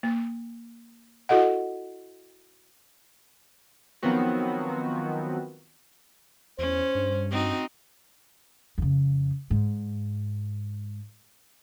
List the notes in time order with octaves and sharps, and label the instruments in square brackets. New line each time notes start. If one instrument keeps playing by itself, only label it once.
[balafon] A#3
E4 F#4 A4 D#5 F#5
[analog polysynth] D#3 F3 F#3 B3 C4 F#4
[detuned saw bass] E2 [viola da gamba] C#4 [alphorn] C5
[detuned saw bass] G2
[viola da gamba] C4 D#4 F#4
[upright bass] F2 C#3
G#2